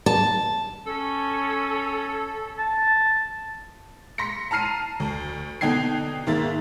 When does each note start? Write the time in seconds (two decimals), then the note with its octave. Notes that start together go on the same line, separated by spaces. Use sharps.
0.06 A5
0.87 C#4 A4
2.58 A5
4.18 C6 A#6 B6 C#7
4.51 A5 A#5 F6 C7 D#7
5.00 D2
5.61 B2 D3 D#4 G5 G#6 C7
6.27 G#2 D#3 A#3 E5 A6